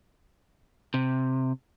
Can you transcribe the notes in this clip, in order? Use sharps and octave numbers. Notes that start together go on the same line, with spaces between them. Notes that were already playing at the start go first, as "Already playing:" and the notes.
C3